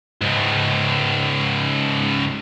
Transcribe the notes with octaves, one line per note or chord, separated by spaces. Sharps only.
C#2 G#2